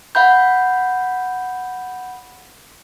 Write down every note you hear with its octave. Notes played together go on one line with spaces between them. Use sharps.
F5 F#5 B5 G6